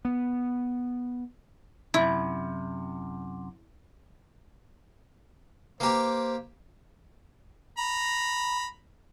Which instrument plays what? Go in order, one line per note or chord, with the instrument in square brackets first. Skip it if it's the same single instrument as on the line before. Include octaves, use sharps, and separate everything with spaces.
[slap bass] B3
[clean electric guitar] F#2 C3 [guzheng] E4
[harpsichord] A#3 G4 [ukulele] B4 A#5 [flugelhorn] C5
[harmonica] A#5 B5